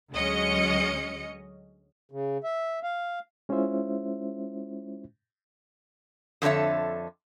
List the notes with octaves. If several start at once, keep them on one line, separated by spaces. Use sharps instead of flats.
D2 F#3 G#3 C#4 D#5 C#7
C#3
E5
F5
G#3 C#4 E4 F4 C5 E5
F2 D3 A4 C#5 E5